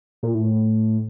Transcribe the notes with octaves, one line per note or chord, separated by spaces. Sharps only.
A#2
A2